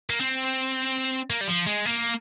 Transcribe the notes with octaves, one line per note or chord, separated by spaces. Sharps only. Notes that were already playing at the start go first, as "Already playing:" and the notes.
A#3
C4
A#3
G3
F3
G#3
A#3